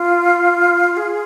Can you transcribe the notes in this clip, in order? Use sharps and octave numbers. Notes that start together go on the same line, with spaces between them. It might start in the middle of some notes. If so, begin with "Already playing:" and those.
Already playing: F4
G#4